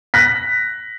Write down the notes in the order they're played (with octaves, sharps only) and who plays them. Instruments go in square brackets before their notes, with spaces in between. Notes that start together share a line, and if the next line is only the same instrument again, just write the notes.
[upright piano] F#6 A#6 B6